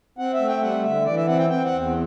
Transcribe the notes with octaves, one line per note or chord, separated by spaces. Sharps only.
C4 F#5
E5
A3
G5
G3 F#5
D3 E5
E3 D5
E5
C4 F#5
G5
C4 G5
F#5
E2